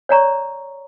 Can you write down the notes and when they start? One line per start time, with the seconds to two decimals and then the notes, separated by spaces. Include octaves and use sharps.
0.09 C#5 D5 A#5 C#6